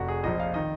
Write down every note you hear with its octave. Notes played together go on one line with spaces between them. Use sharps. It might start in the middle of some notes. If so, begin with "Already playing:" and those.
Already playing: F1 F#4
G#4
A#1 A#2 F3 D#5
F5
D#3 D#5